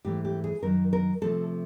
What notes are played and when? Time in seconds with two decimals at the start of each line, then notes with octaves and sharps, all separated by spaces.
0.05 G#2 E3 A3 G4
0.25 G4
0.44 G#4
0.63 F#2 D#3 F#3 A#4
0.93 A#4
1.21 C3 F3 A3 A4